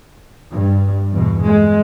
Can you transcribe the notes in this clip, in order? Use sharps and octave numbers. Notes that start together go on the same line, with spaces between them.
G2
E2 B2
G#3